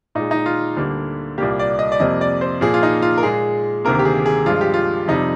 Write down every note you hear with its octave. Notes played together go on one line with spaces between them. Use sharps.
A#2 G#3 D#4
D#4
F4
D2 D3 G3 A#3
C2 A#2 G3 A#3 G4
D5
D#5
D5
F2 C3 G3 A#3 D#5
D5
C5
A#2 F3 A#3 G#4
F4
D#4
F4
A#4
A#2 G#3 G#4
D2 C3 D#3 A#3 A#4
G4
G#4
G#4
G2 F3 G#3 F4
G4
F4
F2 C3 G3 D#4